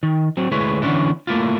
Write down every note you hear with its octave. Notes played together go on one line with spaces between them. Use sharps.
D#3
F#3 C4
D2 G#3 E4 B4 C#5
D3 E3 B3 C#4 D4 E4
A3 A#3 E4 F4